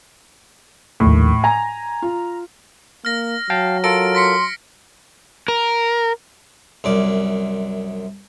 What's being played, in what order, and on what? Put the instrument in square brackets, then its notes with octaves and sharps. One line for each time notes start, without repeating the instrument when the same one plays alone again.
[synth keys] A#1 D#2 [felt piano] A2
[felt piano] G#5 [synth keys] A#5
[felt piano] F4
[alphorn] A#3 [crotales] F6 A#6
[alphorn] F#3 [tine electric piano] F5 G5 A5
[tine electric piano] F4 A4 A#4 [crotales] F6 A#6 D7
[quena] C6 [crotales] A#6 B6 C#7
[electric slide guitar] A#4
[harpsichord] C2 F#2 D5